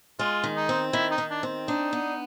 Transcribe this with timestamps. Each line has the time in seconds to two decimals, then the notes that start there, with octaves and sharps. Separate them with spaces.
0.19 G#3 F4
0.44 D#3
0.57 D#4
0.69 C4
0.93 D#3 E4
1.12 D#4
1.18 D#3
1.30 D4
1.43 C4
1.68 D4 D#4
1.93 B3